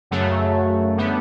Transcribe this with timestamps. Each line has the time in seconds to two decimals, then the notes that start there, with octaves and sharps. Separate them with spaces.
0.11 F#2 C#3 F#3 A3
0.97 D3 G3 B3